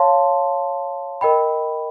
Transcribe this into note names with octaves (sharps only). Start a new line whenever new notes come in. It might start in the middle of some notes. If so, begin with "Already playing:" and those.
Already playing: C#5 F5 A5 C6
A#4 D#5 G5 B5